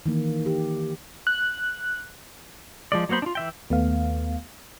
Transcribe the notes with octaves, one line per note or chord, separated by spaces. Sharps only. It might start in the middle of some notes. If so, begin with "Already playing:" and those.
D#3 E3 A#3
G4
F#6
F3 G#3 D5
F#3 A#3 B3 C5 B5
D4 F4
E3 E5 G5
D#2 A3 B3 F5